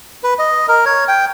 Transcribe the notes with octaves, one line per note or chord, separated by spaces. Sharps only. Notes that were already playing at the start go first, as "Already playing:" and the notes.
B4
D#5
A#4
C#5
G5